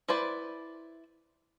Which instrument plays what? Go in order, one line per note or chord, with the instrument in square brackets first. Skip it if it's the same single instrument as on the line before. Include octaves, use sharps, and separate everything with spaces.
[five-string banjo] E4 B4 C5 D5